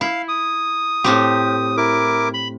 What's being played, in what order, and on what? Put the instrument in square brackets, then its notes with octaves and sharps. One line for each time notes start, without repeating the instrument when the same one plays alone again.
[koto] E4 [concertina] F5
[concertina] D#6
[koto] A2 C4 G4
[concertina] E4 A#4 D6
B5